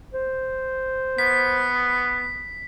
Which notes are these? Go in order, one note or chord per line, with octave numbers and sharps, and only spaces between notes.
C5
B3 B6